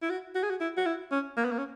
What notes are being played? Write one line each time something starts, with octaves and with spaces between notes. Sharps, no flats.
E4
F#4
F#4
G#4
F#4
E4
F#4
E4
C#4
A#3
B3
A#3
C#4